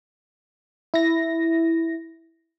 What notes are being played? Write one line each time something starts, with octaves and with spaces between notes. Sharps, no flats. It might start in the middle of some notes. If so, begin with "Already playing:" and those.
E4 A#6